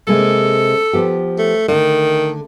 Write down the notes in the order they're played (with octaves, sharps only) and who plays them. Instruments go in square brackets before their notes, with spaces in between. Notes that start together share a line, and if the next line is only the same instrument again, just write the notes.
[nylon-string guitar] C3 G#3 A#3 [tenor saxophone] A4
[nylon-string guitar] F3 B3 G4
[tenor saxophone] A3
[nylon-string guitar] D3 A3 [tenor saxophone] D#3